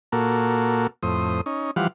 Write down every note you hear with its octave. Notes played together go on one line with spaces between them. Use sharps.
A#2 A#3 F#4 A4
F2 A2 C5 D#6
C#4 D#4
E3 F3 G3 F5 F#5